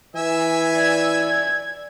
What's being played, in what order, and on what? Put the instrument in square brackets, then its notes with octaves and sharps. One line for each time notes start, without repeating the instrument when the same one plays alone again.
[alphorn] E3 [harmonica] E5 G#5 E6
[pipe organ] D5 [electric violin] G#6